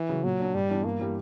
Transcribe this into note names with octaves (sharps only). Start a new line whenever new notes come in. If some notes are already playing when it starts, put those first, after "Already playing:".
Already playing: E3
C#3 F#3
A#2 F#3
A#3 D4
G2 G3
E3 B3 D4
G2 A#3
E3 G3